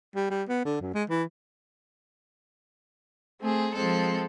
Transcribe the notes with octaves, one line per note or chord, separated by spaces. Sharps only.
G3
G3
B3
D3
F#2
G#3
E3
A3 C4 G#4
F3 G#3 C4 A4